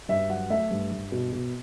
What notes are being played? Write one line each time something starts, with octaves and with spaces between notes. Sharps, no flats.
G2 E5
F#3 F#5
A3 E5
G2
G2
B2
B2